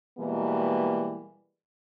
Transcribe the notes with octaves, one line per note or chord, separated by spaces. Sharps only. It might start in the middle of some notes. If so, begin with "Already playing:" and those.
B2 E3 G3 G#3 A#3